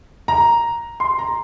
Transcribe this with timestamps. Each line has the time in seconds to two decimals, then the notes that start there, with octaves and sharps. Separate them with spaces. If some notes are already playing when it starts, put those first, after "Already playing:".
0.28 A#5
1.00 C6
1.19 A#5